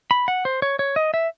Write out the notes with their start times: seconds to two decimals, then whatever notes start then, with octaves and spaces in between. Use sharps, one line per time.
0.11 B5
0.28 F#5
0.45 C5
0.62 C#5
0.79 C#5
0.96 D#5
1.14 E5